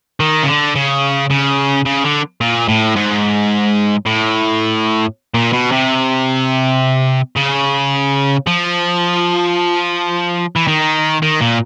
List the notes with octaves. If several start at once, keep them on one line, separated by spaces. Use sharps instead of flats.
D#3
C#3
D3
C#3
C#3
C#3
D3
A#2
A2
G#2
A2
A#2
B2
C3
C#3
F3
E3
D#3
D#3
A#2